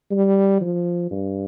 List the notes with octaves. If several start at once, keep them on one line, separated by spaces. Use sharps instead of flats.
G3
F3
G2